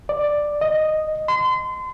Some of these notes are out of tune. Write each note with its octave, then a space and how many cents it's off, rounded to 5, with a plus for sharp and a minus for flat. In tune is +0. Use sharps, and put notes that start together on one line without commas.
D5 +5
D#5 -5
C6 -30